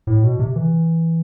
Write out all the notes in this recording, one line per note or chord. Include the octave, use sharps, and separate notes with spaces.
A2
B2
C3
E3